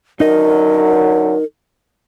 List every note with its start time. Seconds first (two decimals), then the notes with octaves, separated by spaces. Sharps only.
0.20 F#2 D3 F#3 D#4 A#4 D#5